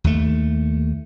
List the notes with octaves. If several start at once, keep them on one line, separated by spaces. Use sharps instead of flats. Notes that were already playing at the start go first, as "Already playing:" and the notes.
D#2 A3